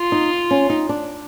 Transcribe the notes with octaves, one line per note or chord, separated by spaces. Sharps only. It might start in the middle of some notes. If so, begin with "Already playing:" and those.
Already playing: F4
D#4
C#4
D#4
D4